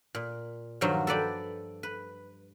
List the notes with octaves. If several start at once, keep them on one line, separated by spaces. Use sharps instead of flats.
A#2
G2 D#3 F3 F#3
A4 B4 D5 G5
B4